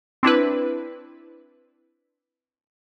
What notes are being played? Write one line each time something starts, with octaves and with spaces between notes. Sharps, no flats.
C4 D4 E4 B4